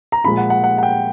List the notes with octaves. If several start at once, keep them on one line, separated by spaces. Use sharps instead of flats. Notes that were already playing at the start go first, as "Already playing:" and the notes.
A#5
A#2 F3 G#3 B5
F#5
F#5
F#5
F#5
G5